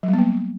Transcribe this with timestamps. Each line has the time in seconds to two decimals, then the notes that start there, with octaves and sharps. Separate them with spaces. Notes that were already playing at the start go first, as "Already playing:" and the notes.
0.03 F#3
0.08 G3
0.13 B3
0.18 A#3